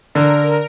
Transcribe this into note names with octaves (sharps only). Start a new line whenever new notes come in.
D3 A#4